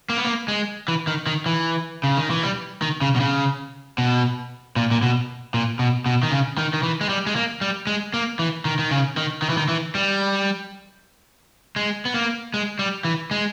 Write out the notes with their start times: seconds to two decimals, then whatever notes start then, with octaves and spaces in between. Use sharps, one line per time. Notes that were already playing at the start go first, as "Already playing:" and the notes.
0.10 A#3
0.17 B3
0.25 A#3
0.48 G#3
0.88 E3
1.07 D#3
1.27 D#3
1.46 E3
2.04 C#3
2.17 D#3
2.30 E3
2.43 G3
2.82 D#3
3.02 C#3
3.16 B2
3.20 C#3
3.98 B2
4.76 A#2
4.91 A#2
5.02 B2
5.54 A#2
5.79 B2
6.06 B2
6.23 D#3
6.31 C#3
6.58 D#3
6.73 D#3
6.83 E3
7.01 G#3
7.09 G3
7.27 G#3
7.36 A#3
7.61 G3
7.87 G#3
8.14 A#3
8.39 E3
8.65 D#3
8.79 D#3
8.91 C#3
9.17 D#3
9.42 D#3
9.50 E3
9.57 D#3
9.68 E3
9.95 G3
11.76 G#3
12.05 B3
12.14 A#3
12.54 G#3
12.79 G3
13.05 E3
13.31 G#3